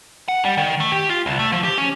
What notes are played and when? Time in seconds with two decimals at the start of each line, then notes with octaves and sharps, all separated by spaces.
0.28 F#5
0.45 G3
0.57 D#3
0.80 A3
0.92 G4
1.09 F4
1.26 C2
1.39 A3
1.52 F3
1.64 G4
1.78 C#4